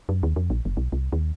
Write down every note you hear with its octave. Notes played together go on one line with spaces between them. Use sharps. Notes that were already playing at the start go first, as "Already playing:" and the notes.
F#2
D#2
F2
A#1
F#1
B1
C2
D#2